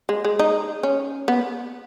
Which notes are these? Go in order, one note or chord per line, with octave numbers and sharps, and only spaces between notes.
G#3
G#3
D#4
C#4
B3